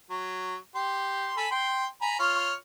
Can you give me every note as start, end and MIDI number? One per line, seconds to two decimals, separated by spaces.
0.10 0.55 54
0.75 1.32 67
0.75 1.32 84
1.37 1.47 69
1.37 1.47 80
1.37 1.47 83
1.51 1.85 79
1.51 1.85 84
2.02 2.18 80
2.02 2.18 82
2.02 2.18 83
2.19 2.53 65
2.19 2.53 73
2.19 2.53 89